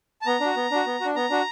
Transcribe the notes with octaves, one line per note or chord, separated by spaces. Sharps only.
A5
B3 A#5
D4 F#4
B3
D4 F#4
B3
F#4
D4
B3 A#5
D4 F#4